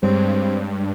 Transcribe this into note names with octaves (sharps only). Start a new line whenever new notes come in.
G2 G3 G#3 C4 C#5